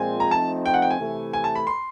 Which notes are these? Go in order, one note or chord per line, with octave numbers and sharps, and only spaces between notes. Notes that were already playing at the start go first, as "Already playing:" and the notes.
Already playing: A#2 F3 G#3 C4 G#5
A#5
F3 A3 C4 D#4 A5
G5
F#5
G5
G#5
C3 E3 A3
G#5
A5
B5
C6